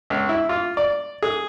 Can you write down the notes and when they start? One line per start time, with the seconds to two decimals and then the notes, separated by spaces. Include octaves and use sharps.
0.10 C#2
0.29 E4
0.49 F4
0.77 D5
1.22 G#4